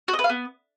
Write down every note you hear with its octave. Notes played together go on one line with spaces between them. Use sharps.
F#4
D#5
B4
F5
B3